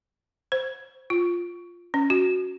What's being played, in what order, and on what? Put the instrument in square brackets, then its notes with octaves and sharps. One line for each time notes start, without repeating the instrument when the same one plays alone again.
[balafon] C5
F4
C#4
F#4